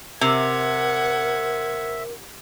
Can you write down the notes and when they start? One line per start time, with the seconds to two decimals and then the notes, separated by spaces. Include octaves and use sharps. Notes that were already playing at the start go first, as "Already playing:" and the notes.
0.21 C3 A#4 E5 F#5 G#6